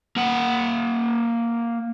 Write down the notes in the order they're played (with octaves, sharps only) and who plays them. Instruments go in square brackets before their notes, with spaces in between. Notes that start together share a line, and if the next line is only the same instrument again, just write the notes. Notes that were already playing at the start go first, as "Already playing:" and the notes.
[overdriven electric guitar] A#3 F#5